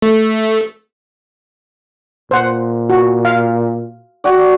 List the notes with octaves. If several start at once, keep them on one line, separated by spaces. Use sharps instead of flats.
A3
A#2 C5 F#5
F#4
F5
F#4 G4 D5